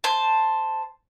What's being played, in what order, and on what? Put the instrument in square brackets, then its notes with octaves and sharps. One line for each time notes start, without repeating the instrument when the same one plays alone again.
[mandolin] C5 A5